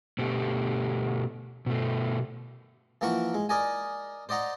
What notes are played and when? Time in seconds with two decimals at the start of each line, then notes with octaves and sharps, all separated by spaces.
0.18 B2 A3 B3 G4
1.66 B2 A3
3.01 E3 F3 A#3 A#4 F#5 C#6
3.34 G#3
3.49 A#4 D5 D#5 G#5
4.29 C5 D5 D#5 F#5 A#5